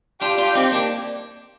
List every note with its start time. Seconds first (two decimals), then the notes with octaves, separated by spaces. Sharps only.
0.21 D4 F4 G4
0.38 D4 F4
0.55 C4 D#4
0.72 A#3 D4